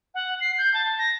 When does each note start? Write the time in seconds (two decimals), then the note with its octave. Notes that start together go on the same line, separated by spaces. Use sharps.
0.15 F#5
0.41 C7
0.58 G6
0.74 A5
0.98 A#6